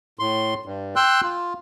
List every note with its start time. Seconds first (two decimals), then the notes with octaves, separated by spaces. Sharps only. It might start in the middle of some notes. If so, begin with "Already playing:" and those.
0.19 A2 C6
0.66 G2
0.96 G5 C6 E6 F#6
1.23 F4